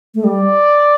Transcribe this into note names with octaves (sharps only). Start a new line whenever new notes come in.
A3
G3 D5